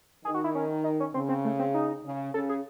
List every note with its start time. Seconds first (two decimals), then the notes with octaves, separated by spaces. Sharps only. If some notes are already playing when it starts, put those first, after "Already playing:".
0.25 D#3 G#4
0.34 F#4
0.44 E4
0.55 C#4
0.84 D#4
1.00 C#4
1.14 C#3 C4
1.29 C4
1.45 A3
1.59 C4
1.74 D#4
2.04 C#3
2.34 C#3 A4
2.49 G#4